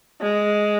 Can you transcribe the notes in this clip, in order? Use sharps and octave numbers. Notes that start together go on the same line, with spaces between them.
G#3